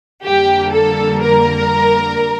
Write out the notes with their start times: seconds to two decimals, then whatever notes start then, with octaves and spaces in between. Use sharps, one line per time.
0.24 F2 D3 G3 A#3 G4
0.73 A4
1.21 A#4